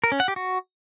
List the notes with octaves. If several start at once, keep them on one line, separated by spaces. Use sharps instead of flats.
A#4
C#4
F#5
G4
F#4